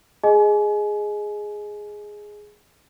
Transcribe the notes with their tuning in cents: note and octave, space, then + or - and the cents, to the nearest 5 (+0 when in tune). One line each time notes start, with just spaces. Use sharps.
G#4 +0 D#5 +0 G#5 +30